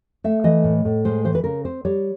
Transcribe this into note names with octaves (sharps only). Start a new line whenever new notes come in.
A3 E5
E3 D#5
A2
A2
G#3 C5
E3 C5
B4
C#3 A#4
C4 C5
G3 C#5